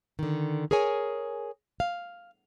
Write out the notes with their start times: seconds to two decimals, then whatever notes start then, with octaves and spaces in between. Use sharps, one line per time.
0.19 D3 D#3
0.71 G#4 A#4 C#5 G#5
1.80 F5